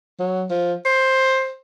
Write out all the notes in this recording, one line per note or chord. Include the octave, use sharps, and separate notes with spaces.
F#3
F3
C5